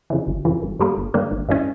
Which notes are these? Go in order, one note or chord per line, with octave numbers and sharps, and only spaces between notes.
F2 C#3 E3
G1
F2 C#3 E3
G1
G2 D3 G3 A#3
G1
G2 D3 G3 A#3
G#1
G2 E3 G#3 C#4